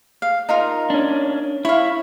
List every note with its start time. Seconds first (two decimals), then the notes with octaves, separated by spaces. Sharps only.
0.22 F5
0.49 D#4 F4 A#4
0.90 C#4 D4
1.65 E4 C#5 F5